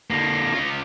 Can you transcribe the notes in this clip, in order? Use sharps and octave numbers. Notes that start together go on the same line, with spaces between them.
D3 A#3 A#6
C#4 F4